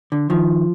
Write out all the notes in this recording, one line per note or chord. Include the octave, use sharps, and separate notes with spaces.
D3
D#3 F3